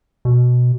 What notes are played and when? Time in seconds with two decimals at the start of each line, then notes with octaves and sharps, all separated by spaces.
0.25 B2